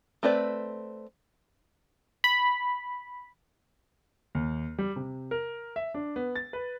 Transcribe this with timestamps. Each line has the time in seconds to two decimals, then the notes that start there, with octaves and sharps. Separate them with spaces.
0.23 A3 C4 B4 D5
2.24 B5
4.35 D#2
4.78 G3
4.96 C3
5.31 A#4
5.76 E5
5.94 D4
6.16 B3
6.36 A6
6.53 B4